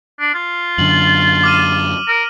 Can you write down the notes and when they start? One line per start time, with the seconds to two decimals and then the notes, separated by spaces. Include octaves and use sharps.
0.20 D4
0.34 F4
0.78 F#2 D3 F#7
1.43 D6 F6 D#7
2.08 A#4